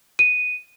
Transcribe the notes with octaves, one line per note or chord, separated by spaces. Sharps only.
D#7